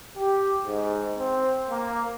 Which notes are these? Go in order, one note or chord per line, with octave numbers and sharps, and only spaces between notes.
G4
G#2
C4
A#3